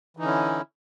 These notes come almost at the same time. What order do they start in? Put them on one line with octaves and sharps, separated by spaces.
E3 D#4 D3 C#4 E4